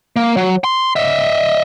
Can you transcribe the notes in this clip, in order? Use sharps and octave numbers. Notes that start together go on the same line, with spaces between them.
A#3
F#3
C6
D#5 E5